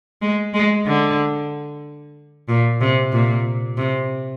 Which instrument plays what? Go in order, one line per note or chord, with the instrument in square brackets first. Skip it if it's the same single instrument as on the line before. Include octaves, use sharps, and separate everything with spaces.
[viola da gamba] G#3
G#3
D3
A#2
C3
A#2
C3